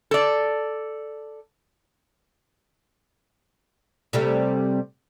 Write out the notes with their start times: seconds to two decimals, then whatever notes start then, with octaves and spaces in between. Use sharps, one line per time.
0.11 A4 D5
4.13 C3 G3 A3